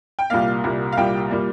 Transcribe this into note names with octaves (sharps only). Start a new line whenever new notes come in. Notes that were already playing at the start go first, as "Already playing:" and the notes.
G5
C2 A#2 G3 A#3 F5
C2 A#2 G3 A#3
F5
C2 A#2 G3 A#3 G5
A#2 G3 A#3